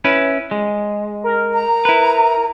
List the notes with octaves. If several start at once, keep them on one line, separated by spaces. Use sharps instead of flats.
C#4 E4 B4
G#3
A#4
A#5
E4 B4